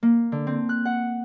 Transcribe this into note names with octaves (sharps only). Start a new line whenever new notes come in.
A#3
D3
C4
F#6
F#5